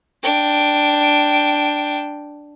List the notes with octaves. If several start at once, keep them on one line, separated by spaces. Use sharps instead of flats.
D4 G5